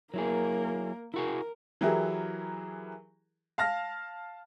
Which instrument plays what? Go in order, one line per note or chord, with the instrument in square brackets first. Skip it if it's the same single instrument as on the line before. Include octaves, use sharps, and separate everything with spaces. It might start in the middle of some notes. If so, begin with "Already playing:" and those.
[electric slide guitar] F#3 E4 G#4 [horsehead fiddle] A#3 A#4
[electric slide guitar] E4 F#4 G#4 [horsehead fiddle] A#4
[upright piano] E3 F#3 E4 G4 G#4 A#4
F5 A5 F6 A#6